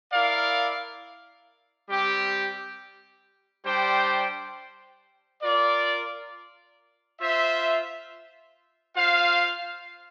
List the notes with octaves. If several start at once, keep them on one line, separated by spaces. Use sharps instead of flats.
E4 A#4 D5 F5
G3 C4 G4
G3 D4 G4 C5 G5
F4 A#4 D5
F4 C5 E5
F4 C5 F5